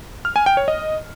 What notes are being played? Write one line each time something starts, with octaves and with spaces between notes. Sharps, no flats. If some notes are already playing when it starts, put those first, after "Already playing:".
F6
G#5
G5
C#5
D#5